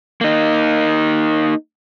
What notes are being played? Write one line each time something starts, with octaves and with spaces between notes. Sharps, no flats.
A#3 D#4